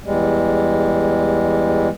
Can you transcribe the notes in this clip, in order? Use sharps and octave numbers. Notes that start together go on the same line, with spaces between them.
E2 G3 G#3